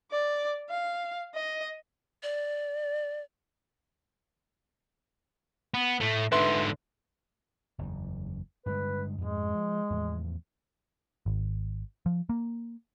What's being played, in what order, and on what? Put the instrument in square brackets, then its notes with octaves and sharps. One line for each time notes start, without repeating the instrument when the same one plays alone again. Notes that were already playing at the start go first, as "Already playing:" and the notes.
[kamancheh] D5
F5
D#5
[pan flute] D5
[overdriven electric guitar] B3
A2 A3
[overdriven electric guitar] G#2 D3 [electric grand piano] B4 E5 C6
[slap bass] F#1 E2
[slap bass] G2 D3 G#3 [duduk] B4
[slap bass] F2 G#2 [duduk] G#3
[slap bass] F3
E2 A2 F3
[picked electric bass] G#1
F3
A#3